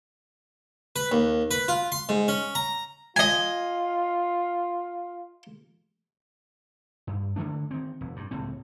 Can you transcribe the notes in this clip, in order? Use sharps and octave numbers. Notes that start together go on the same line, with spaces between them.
B4
D#2
B4
F4
C6
G#2
C#4
A#5
F4 D#5 G#5
G2
D3 F#3 A3 D4
D#3 C4
F1
G2
C#2 A2 C4